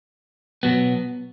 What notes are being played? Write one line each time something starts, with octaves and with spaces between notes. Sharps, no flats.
B2 F#3 B3